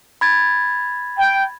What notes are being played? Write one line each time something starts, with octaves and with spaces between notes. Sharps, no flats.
B5 G#6 A6
G5